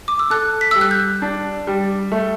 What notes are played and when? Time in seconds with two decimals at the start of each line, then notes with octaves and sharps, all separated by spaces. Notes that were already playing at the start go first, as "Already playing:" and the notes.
0.08 D6
0.19 E6
0.30 A4 F#6
0.61 B6
0.71 G3 E6
0.81 F#6
0.91 G6
1.22 D4
1.67 G3
2.12 A3